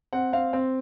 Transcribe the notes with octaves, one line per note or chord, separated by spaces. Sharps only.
C4 F#5
C4 F5
C4